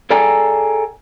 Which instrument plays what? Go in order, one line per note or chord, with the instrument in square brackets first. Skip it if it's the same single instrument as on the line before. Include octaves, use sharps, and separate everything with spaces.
[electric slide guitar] G#4 A4 D5 G5 G#5 A#5